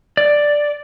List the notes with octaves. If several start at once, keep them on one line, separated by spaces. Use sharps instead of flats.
D5